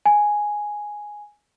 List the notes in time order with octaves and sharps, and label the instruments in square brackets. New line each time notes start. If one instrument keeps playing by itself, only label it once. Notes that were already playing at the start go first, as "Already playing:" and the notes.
[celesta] G#5